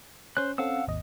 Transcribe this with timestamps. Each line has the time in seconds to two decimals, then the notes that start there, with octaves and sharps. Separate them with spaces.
0.37 C#4 C5 F#6
0.58 C4 C#4 A4 F5 F#5 E6
0.87 G#1 D#2 D#5